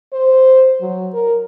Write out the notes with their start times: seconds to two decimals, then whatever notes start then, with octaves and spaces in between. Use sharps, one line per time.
0.13 C5
0.81 F#3
1.14 A#4